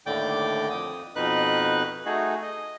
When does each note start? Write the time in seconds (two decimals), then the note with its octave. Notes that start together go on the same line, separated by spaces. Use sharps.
0.06 D#2 A2 D3 D5 G5 D6
0.70 F2 D#6
1.16 F2 B2 D#4 B4 F#6
2.06 A3 D#4 F#4 G#4
2.42 D#5